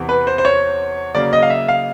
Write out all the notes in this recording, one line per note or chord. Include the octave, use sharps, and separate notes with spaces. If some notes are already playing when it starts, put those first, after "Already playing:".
Already playing: E2 C3 E3
B4
C5
C5
C#5
C#3 F#3 A#3 D5
D#5
F5
E5
F5